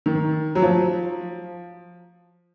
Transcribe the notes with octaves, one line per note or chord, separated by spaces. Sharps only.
D#3
F#3
F3